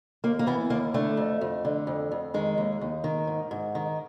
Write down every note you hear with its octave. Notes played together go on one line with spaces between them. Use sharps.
D#2 A#3
A#3
E3 B3
D#2 A#3
D3 A3
F2
F2
D3
F2
F2
D#3 G#3
D#2
D#2
D#3
G#2
G#2
D#3